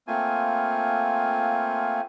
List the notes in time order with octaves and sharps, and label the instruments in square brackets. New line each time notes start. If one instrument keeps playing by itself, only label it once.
[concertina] A3 A#3 C4 F4 G#5